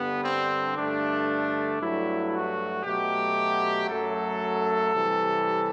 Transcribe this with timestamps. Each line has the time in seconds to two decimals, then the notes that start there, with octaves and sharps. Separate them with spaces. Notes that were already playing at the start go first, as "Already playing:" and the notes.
Already playing: G2 D3 G3 B3
0.24 C4
0.76 G2 D3 A3 D4
1.80 G2 F#3 A3 E4
2.32 F#4
2.84 B2 F#3 A3 G4
3.89 F#2 F#3 A3 A4
4.93 C3 E3 G3